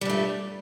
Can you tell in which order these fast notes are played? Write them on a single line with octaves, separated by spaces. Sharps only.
G3 G2 A3